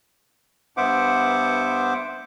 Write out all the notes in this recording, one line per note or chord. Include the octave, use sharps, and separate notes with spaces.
G2 B3 C5 E5 F#5 D6